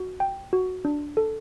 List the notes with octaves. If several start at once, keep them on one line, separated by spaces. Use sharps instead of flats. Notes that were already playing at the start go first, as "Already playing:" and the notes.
Already playing: F#4
G5
F#4
D4
A4